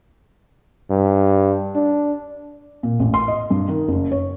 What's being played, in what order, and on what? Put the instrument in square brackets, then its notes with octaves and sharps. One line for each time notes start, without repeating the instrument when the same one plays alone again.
[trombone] G2
D4
[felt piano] A#2
A1
C6
D#5
G2
D#3
F#1
C#5